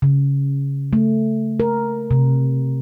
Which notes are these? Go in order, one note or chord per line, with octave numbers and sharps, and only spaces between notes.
C#3
A3
A#4
C3